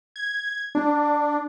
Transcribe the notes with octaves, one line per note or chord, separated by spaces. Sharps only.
G#6
D4